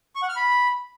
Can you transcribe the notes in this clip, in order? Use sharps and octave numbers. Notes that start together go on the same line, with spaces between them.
C#6
F#5
F6
B5